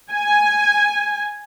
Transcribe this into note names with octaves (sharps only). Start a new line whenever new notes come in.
G#5